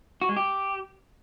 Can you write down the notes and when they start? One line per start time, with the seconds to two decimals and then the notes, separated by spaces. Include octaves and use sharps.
0.22 F#4
0.29 G#3
0.36 G4